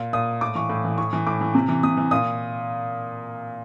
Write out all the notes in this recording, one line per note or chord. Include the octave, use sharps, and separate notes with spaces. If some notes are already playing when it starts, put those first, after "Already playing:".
Already playing: A#2
A#2 D#6
A2 D6
E3 C#6
A2
E3
A2 C#6
E3
A2 D6
E3
C3
E3
C3 D#6
E3
A#2 D#6